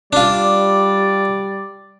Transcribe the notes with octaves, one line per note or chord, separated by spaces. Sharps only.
G3 D4 F4 D5